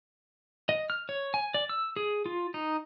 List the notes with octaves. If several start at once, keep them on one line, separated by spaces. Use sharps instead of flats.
D#5
F6
C#5
G#5
D5
E6
G#4
F4
D#4